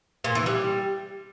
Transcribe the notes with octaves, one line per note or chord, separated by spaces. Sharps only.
A#2
E3
G3